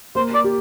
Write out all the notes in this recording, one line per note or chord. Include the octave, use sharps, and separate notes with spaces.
A#3 C5
D5
G4